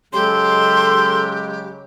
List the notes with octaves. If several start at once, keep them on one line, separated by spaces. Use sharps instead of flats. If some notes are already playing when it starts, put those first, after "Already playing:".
C#3 F#3 G#3 G4 A4 C6